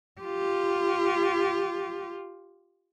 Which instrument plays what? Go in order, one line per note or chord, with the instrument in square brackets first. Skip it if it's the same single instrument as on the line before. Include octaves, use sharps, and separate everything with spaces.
[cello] F4 G4